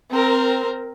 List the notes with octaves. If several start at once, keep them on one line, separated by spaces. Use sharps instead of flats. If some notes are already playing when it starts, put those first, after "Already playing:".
C4 A#4